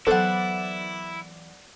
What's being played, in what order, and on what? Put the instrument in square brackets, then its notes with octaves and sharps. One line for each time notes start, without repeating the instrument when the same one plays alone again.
[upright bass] E3 F#3 [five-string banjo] B3 A4 C5 [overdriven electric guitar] E4 [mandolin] D5 F#5